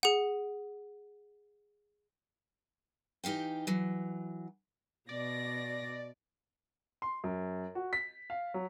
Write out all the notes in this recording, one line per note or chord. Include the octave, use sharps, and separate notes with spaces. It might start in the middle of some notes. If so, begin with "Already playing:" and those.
G#4 F#5
E3 D#4 G4 F5 G5
E3 F#3
B2 D5 A#6
C6
F#2
F#4
B6
F5
F#3